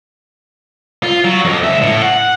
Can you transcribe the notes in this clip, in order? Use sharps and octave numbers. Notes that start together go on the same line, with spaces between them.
F4
F#3
F2
C#2 E5
A2
F#5